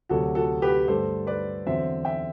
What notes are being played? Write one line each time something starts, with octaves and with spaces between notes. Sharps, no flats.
D2 C3 F#3 F#4 A4
F#4 A4
G4 B4
G2 D3 A3 A4 C5
B4 D5
E2 D3 F#3 C4 C5 E5
E5 G5